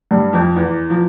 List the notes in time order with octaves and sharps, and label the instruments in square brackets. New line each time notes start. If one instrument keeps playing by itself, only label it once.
[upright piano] G2 G3
F2 F3
E2 E3
F3